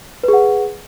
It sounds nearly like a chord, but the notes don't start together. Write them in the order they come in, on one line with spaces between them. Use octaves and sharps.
B4 G#4 F#5